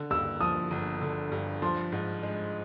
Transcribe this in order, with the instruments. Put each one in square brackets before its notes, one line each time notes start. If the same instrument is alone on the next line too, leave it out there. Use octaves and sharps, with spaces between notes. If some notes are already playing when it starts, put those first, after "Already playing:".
Already playing: [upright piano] D3
[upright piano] G2 [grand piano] E6
[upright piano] F3 [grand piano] D#6
[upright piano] G1
D3
G2
[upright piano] F3 [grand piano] C6
[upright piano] G#2
G#3